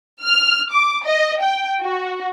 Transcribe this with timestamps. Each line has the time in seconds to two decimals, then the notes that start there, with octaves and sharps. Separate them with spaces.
0.24 F6
0.72 D6
1.06 D#5
1.42 G5
1.82 F#4